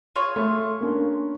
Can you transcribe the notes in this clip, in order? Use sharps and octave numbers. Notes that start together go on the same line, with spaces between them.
F4 G#4 C#5
A3 C6
A#3 C#4 D4